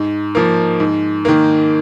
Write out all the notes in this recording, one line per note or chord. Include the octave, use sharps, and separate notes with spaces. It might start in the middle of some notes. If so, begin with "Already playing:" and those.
Already playing: G#2
F3 A#3
G#2
D#3 A#3